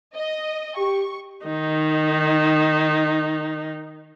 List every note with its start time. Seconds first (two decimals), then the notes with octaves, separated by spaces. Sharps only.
0.14 D#5
0.77 G4 C#6
1.45 D#3 D#4